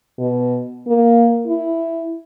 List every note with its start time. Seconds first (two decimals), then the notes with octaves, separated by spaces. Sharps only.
0.19 B2
0.88 A#3
1.47 E4